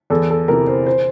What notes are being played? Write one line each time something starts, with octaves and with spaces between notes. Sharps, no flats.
E2 A4
A4
C3 E3 A#4
C5
C5